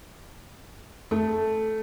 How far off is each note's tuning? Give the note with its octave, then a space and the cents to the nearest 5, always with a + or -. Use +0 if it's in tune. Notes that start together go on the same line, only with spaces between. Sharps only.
A3 -5 A4 +0